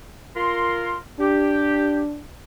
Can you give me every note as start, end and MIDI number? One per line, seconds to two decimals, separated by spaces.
0.36 0.97 65
0.36 0.97 70
0.36 0.97 84
1.20 2.20 62
1.20 2.01 67